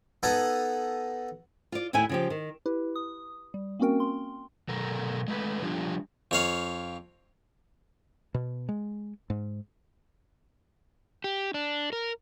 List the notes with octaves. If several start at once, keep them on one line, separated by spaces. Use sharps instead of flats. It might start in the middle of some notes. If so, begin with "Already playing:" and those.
B3 D#4 A4 D#5 F#5 G#5
F4 D5
D#2 A2 E4 G5 G#5
C#3 F3 G4
D#3
E4 G4 B4
D#6
G3
A#3 C4 C#4 F#4 A#4 G5
C6
B2 F#3 A4 A#4
G#3 A3 B4
F3 G3 D4 F4 G4
F2 C#5 F5
B2
G#3
G#2
G4
D4
A#4